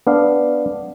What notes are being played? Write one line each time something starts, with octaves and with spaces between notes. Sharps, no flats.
B3 D4 F5